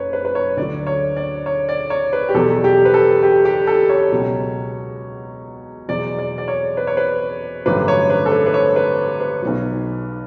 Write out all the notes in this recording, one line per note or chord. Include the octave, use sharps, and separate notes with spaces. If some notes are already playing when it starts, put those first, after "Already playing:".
Already playing: F#1 F#2 B4 C#5
B4
B4
C#5
D2 D3 F#3 D5
C#5
D5
C#5
D5
C#5
B4
G4
E2 B2 F#3 A4
G4
B4
A4
G4
G4
A4
C#5
C#2 B2 F#3
E2 B2 F#3 D5
D5
D5
C#5
B4
C#5
B4
A1 G2 D3 F#3 B4
C#5
B4
A4
B4
B4
C#5
B4
B4
B1 B2 F#3